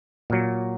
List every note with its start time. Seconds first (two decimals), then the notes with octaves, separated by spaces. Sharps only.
0.30 A#2 F#3